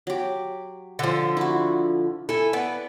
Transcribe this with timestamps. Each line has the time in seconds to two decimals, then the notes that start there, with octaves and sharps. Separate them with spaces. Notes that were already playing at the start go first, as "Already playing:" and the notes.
0.07 F#3 G4
0.99 D3 F3
1.37 E4 F#4
2.29 E4 A4 G#5
2.53 B3 D5